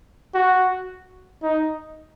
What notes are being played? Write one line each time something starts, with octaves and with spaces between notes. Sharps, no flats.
F#4
D#4